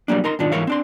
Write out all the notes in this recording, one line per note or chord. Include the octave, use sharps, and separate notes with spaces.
F#3 G3 A#3 D4
D#4 A#4 A#5 C6
B1 G#2 D#3 D4 F4
G#2 E3 A#4 C#5 F5
C4 D4 C6